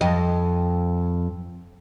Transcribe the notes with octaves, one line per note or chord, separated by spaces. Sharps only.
F2 D#5